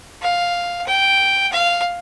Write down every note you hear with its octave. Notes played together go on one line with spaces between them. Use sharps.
F5
G5
F5